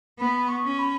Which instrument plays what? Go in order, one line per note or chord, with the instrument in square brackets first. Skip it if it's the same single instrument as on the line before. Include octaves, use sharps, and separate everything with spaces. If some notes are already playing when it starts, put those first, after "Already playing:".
[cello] B3 [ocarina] B5
[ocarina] C#6
[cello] C#4
[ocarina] B5